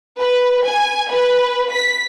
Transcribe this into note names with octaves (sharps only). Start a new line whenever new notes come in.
B4
G#5
B4
B6